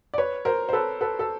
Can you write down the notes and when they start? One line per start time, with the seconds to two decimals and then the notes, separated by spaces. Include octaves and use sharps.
0.14 D5
0.18 B4 C#5
0.45 A#4 C5
0.69 C5
0.73 A4 B4
1.01 A4 B4
1.19 A4